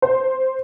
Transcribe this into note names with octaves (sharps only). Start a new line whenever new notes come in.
C5